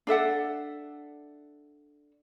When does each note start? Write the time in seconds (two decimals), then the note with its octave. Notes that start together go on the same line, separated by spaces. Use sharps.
0.07 D4 A4 E5 F#5